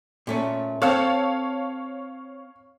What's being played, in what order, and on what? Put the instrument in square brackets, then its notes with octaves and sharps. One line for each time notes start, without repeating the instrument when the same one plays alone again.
[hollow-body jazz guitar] A#2 A3 C#4
[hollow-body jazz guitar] C4 A4 [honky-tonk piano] C#5 F5